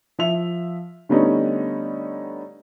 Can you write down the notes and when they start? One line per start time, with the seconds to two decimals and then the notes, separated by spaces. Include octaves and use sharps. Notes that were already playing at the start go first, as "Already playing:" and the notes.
0.18 F3 E5 F7
1.09 D3 G3 A3 B3 C#4 D#4